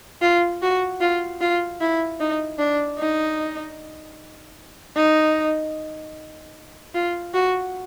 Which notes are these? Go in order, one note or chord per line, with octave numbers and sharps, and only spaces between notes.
F4
F#4
F4
F4
E4
D#4
D4
D#4
D#4
F4
F#4